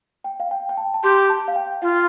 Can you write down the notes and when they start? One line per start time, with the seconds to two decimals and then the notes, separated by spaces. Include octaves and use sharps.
0.24 G5
0.40 F5
0.51 G5
0.69 G5
0.77 A5
0.94 A5
1.03 G4 C6
1.30 A5
1.48 F5
1.56 G5
1.82 F4 F5